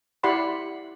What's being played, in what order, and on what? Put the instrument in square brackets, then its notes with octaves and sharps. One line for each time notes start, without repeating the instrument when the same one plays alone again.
[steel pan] E4 G4 D5 F#5 B5 C6